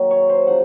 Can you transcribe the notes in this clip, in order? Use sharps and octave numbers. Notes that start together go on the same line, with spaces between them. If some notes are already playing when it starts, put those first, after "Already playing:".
Already playing: D#3 F#3 A#3
C#5
C5
C#3 F3 F#5